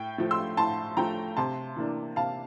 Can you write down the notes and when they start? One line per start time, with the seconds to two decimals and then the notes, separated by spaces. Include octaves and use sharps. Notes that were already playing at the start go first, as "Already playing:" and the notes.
Already playing: A2 G5
0.18 F3 A3
0.31 C6 E6
0.57 A2 A5 C6
0.97 F3 A3 G5 A#5
1.37 C3 A5 C6
1.76 E3 A#3 D4
2.16 C3 F5 A5